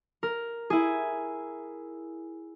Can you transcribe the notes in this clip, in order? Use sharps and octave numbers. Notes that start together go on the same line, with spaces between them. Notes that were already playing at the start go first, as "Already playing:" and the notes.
A#4
E4 G#4